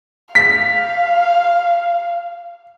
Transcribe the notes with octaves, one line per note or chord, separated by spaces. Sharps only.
F5 B6